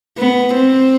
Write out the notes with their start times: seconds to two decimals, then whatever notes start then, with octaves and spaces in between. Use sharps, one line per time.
0.18 B3
0.54 C4